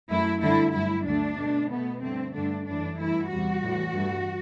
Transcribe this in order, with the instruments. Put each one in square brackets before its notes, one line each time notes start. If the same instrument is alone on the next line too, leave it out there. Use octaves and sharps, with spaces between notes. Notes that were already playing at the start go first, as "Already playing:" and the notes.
[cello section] F#2 F#3 A3 E4
G2 D3 A3 E4
G2 F#3 A3 E4
D2 D3 A3 D4
B2 A3
B2 A3 B3
G2 D3 A3 C4
G2 D3 A3 D4
F#2 E3 A3 D4
G2 E3 A3 E4
E2 C3 G3 F#4
A2 E3 G3
G2 E3 A3